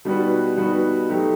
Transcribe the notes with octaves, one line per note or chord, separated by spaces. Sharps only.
B2 G3 D#4 F#4 B4
B2 G3 D#4 F#4 B4
F#3 A3 D#4 G4